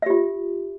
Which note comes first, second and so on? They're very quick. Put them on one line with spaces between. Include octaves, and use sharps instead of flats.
E5 G4 F4